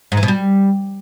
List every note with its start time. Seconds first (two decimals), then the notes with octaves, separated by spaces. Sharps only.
0.12 G#2
0.17 E3
0.23 B2
0.28 G3